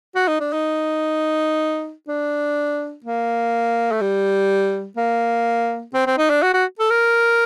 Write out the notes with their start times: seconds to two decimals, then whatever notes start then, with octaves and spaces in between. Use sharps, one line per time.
0.16 F#4
0.28 D#4
0.40 D4
0.53 D#4
2.08 D4
3.04 A#3
3.92 A3
4.01 G3
4.97 A#3
5.94 C4
6.07 C4
6.18 D#4
6.30 D4
6.43 F#4
6.54 F#4
6.79 A4
6.90 A#4